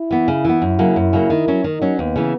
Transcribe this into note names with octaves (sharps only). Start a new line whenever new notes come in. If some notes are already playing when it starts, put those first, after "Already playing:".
Already playing: E4
E3 B3
C#3
E3 B3
F#2 E4
C#3 F#3 A#3
F#2
C#3 F#3 A#3
D#3
F#3 C#4
D#3 D#4
F#3 C#4
D#2 B3
C#3 E3